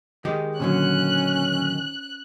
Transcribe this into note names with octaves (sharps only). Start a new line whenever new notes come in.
D#3 G#3 G4
A#2 D3 F#3 C#4 F#6